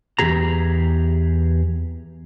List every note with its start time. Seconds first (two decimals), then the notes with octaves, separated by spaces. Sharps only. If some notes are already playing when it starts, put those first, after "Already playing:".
0.19 E2 G2 G4 G#4 A#5